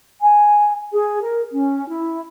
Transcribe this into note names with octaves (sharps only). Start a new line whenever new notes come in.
G#5
G#4
A#4
C#4
E4